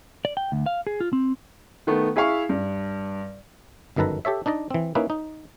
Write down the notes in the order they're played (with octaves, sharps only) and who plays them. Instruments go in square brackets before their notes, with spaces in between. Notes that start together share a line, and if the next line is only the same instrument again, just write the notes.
[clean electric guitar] D5
G5
D2
F5
G#4
F4
C4
[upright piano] D#3 A3 B3
E4 G#4 E5 F5 C#6
G2
[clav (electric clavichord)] G1 F#2 D#3 A4 B4 A#5
G4 A4 C#5 E5
D4 D#4 D5 D#5
E3 C4
A#3 C#4 D#4 E4 B4
D#4